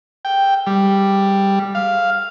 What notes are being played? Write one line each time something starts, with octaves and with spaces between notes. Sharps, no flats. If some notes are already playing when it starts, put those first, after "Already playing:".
G5
G3
F5